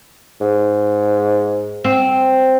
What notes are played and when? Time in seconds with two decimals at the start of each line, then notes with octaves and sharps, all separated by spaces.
0.41 G#2
1.84 C4